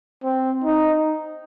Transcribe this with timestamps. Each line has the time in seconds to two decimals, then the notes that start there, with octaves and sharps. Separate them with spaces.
0.24 C4
0.64 D#4